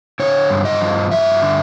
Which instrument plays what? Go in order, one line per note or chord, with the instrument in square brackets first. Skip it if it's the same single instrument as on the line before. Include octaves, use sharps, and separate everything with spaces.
[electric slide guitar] D3 C#5
G2
D#5
F3
G2 E5
D3